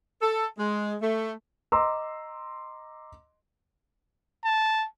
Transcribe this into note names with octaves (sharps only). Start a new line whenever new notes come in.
A4
G#3
A3
D#5 A#5 C6 D6 E6
A5